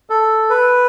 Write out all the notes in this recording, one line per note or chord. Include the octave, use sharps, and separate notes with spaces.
A4
B4